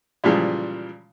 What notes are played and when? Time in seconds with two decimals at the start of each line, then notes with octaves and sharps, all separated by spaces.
0.24 A#2 C#3 E3 F3 G3 G#3